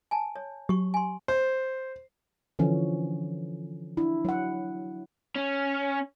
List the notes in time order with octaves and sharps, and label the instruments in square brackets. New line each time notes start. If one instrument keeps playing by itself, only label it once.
[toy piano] G#5 A5
C#5
[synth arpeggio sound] F#3 [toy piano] G4 C#6
[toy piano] G#5 C6
[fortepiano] C5
[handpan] D3 E3 F3 C#4
D4 E4
F#3 F#5
[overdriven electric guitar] C#4